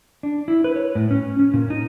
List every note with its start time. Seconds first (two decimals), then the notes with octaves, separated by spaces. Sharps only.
0.23 D4
0.48 E4
0.64 B4
0.76 C#5
0.95 A2
1.11 C#4
1.39 C#4
1.54 A#2
1.70 D#4